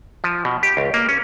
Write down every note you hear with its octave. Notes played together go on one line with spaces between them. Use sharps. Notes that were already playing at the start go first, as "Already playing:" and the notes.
F3
B2
G4
C#2
A#3
C#4